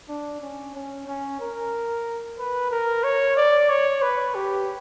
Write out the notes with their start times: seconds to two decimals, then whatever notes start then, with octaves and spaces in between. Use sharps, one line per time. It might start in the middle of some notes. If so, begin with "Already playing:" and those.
0.08 D4
0.41 C#4
0.74 C#4
1.07 C#4
1.40 A#4
2.38 B4
2.71 A#4
3.04 C#5
3.37 D5
3.69 C#5
4.02 B4
4.35 G4